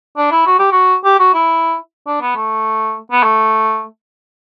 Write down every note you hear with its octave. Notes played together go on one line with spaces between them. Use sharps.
D4
E4
F#4
G4
F#4
G4
F#4
E4
D4
B3
A3
B3
A3